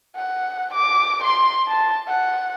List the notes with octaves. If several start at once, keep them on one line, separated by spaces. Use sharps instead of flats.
F#5
D6
C6
A5
F#5